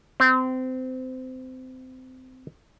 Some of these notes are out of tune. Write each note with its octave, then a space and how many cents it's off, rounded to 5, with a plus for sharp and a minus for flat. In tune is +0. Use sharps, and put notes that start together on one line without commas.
C4 -25